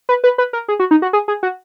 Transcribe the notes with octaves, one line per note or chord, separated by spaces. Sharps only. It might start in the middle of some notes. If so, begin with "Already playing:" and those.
B4
B4
B4
A#4
G#4
F#4
D#4
F#4
G#4
G#4
F#4